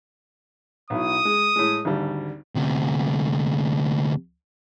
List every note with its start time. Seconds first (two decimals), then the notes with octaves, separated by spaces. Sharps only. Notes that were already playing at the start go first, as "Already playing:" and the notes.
0.90 B1 B2 E4 D#6
1.25 G#3
1.56 A2 G#3
1.85 G#1 D2 G3
2.55 D2 C3